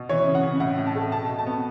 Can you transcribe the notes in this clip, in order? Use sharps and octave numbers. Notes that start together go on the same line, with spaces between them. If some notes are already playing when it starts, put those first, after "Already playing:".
Already playing: B2
E3 C#5
C#3
F#5
C#3
A2 F#5
A2
A5
A3
B2 A5
B2
A5
B3